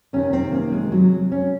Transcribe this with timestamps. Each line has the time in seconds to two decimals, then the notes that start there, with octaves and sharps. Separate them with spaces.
0.13 C3 D#3 C#4
0.33 C4
0.52 A#3
0.72 G#3
0.92 F#3
1.32 C#4